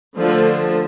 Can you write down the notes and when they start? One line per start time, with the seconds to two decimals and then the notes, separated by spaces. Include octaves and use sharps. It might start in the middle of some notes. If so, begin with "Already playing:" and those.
0.18 D3 F3 A3